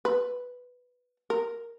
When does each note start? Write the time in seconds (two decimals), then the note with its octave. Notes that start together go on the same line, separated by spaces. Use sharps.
0.05 B4
1.30 A#4